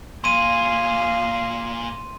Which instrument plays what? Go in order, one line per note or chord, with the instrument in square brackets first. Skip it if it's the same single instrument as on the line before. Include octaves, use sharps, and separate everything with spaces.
[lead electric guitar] A#2 [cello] G#4 F5 [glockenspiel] C6 D#7